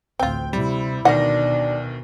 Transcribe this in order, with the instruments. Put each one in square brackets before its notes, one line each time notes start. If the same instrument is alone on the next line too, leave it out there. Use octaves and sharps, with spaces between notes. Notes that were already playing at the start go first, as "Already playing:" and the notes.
[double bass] A1 D2 [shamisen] C4 F4 [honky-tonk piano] G5
[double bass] C3 E4 [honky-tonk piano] G3
[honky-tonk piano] D2 D#3 A#6 [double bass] B2 [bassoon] D4 [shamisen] A#4 F#5